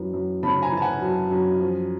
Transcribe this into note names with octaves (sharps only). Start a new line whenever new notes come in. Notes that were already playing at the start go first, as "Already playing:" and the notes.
Already playing: F#2 E3
F#2
C#3 A5 B5
G#5 A#5
E3
A5
F#5 G#5
F#2
F#2
F3